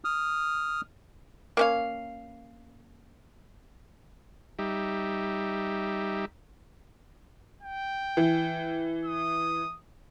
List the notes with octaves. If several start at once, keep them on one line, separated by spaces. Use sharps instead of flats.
D#6 F6
A#3 C#4 F5
G3 D#4 G4 E5
G5
E3
D#6